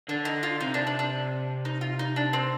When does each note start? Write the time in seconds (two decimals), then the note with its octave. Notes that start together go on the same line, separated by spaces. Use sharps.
0.08 D3 D4
0.25 D#4
0.43 F4
0.60 C3 D#4
0.74 D4
0.87 D4
0.99 D4
1.65 D#4
1.81 F4
1.99 D#4
2.16 D4
2.33 C4